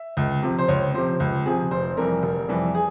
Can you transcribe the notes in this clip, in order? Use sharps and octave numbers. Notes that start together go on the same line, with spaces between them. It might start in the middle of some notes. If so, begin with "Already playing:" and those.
Already playing: E5
C#2
C3 F3
C5
C#2 C#5
C3 F3 C5
C#2
C3 F3 G#4
F1 C5
F2 E3 G3 A#4
F1
F2 E3 G3
G#4